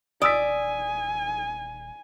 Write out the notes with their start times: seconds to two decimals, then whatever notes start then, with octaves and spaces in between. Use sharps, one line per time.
0.22 D#1 D5 G#5 D#6 E6 B6